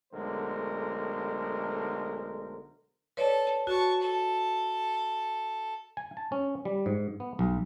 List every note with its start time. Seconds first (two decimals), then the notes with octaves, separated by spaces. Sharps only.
0.13 B1 D3 G#3 A3 A#4 C5
3.17 A4 B4 C#5 D5
3.67 F#4 A5 C#6
4.01 A4
5.97 G#5
6.17 A5
6.32 C#4
6.65 G3
6.86 G#2
7.20 B3
7.39 B1